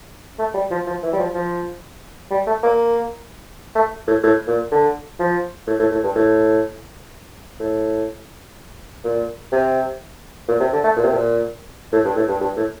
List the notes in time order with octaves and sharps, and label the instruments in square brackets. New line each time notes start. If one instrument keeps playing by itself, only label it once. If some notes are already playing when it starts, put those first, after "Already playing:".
[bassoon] A3
G3
F3
F3
E3
G3
F3
F3
G3
A3
A#3
A3
A2
A2
A#2
D3
F3
A2
A2
A2
G2
A2
A2
A#2
C3
A#2
C3
D3
A3
A#2
C3
A#2
A2
G2
A2
G2
G2
A2